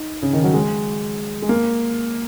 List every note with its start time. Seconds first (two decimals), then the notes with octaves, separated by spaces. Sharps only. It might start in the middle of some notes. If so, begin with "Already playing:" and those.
Already playing: D#4
0.22 C#3
0.33 D#3
0.44 F#3
0.54 G#3
1.42 G#3
1.49 A#3